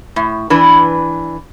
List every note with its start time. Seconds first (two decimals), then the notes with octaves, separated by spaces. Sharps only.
0.16 A2
0.50 E3 D4 B4